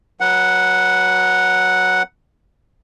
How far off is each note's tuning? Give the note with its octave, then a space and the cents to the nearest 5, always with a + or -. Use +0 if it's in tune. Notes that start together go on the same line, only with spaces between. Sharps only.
F#3 -5 B4 -35 F#5 +0